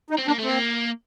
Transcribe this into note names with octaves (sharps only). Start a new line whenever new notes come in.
D#4
C4
A#3 D4
A3 C4
A#3